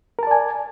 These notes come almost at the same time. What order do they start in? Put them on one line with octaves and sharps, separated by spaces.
A#4 A5 D5 G#5